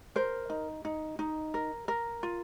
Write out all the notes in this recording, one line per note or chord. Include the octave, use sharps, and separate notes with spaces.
A#4 C5
D#4
D#4
D#4
A#4
A#4
F4